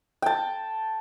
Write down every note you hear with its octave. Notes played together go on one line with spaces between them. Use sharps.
G5 A5